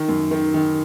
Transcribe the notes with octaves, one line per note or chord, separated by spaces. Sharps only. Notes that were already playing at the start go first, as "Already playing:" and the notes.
Already playing: D#3
F#2
D#3
D#3